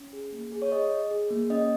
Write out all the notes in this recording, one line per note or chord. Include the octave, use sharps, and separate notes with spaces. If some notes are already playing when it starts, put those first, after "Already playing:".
Already playing: C#4
G#4
A#3
G#4
C#5
G#4 D#5
G#4
G#4
A#3
C#4 D#5